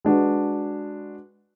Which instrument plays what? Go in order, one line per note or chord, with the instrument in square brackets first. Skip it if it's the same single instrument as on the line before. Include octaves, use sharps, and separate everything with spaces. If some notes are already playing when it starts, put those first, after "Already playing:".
[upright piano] G#3 D4 F#4 B4